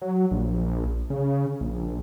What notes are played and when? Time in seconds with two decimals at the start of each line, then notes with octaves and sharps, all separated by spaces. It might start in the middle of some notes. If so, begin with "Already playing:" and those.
0.02 F#3
0.31 A#1
1.10 C#3
1.61 A#1